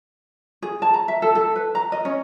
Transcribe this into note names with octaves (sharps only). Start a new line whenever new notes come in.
G#4
A5
A#5
E5
A4
A4
B4
A#5
D#5
C#4